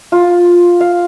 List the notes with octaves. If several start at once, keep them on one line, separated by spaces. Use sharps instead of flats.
F4
F5